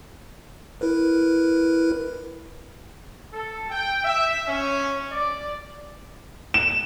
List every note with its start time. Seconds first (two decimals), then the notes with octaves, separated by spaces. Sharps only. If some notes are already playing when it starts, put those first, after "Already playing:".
0.81 E4 A#4 B4
3.33 A4
3.70 G5
4.04 E5
4.47 C#4
5.12 D5
6.54 E7